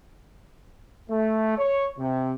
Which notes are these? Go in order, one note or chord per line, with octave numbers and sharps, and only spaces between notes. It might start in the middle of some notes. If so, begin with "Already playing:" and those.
A3
C#5
C3